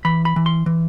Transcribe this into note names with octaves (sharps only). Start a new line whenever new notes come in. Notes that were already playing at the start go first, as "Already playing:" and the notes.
E3 B5
B5
E3
C6
E3